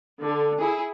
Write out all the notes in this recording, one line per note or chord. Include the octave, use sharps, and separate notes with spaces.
D3
E4 G#4